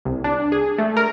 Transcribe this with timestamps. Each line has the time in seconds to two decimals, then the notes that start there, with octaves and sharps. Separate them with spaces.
0.05 C2
0.24 D4
0.52 G#4
0.78 A3
0.97 A#4